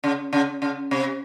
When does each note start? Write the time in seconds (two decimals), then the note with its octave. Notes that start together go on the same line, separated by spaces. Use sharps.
0.04 C#3
0.33 C#3
0.62 C#3
0.91 C3